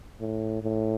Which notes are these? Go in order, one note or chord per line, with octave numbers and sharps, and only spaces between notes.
A2
A2